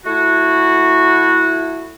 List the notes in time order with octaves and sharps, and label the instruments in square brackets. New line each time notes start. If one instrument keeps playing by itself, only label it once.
[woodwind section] A3 E4 F#4